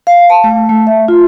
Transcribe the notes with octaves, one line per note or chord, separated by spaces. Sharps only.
F5
A5
A3
A3
E5
F4